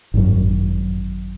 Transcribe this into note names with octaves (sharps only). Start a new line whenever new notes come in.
G#1 F#2